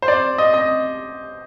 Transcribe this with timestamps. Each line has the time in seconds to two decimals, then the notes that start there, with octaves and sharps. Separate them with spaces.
0.02 C5
0.08 D5
0.38 D#5
0.54 D#5